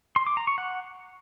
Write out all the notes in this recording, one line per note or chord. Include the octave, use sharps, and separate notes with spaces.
C6
D6
A#5
C#6
F#5